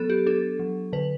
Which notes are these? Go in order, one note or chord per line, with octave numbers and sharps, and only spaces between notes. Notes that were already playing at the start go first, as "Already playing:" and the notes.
Already playing: F#3 B3 A4
G4
D4 A4
F#3
D3 B4